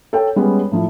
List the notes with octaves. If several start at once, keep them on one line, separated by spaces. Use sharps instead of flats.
A4 C#5 G5
G3 G#3 B3 C#4
A2 F3 E4